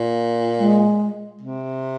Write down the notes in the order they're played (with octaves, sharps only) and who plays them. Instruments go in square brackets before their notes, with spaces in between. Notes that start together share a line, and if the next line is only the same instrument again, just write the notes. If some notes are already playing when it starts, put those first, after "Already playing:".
Already playing: [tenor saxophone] A#2
[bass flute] G#3
[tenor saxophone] C3